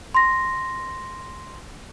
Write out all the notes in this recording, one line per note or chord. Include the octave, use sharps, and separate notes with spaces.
C6 A#6